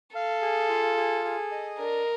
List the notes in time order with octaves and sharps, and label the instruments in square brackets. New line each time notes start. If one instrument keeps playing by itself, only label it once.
[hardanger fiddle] A4 [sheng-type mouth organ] F5
[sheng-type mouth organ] G#4
F4
G#4
G#4
D#5
[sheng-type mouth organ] D4 [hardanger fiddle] A#4